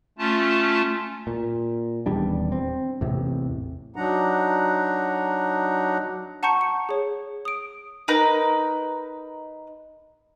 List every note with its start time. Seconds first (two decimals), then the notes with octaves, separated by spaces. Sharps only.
0.18 A3 C#4 F4 A5
1.27 A#2
2.06 D#1 E2 G3 D4
2.52 C4
3.01 A1 E2 C3
3.96 F#3 D4 D#4 F#5 A#5
6.43 F#5 A5 A#5 C#6 G6 C#7
6.61 C#7
6.89 G#4 C#5
7.45 D#6 D7
8.08 D#4 A#4 B4